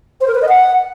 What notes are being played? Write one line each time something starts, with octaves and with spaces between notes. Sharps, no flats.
C5
A#4
B4
D#5
F#5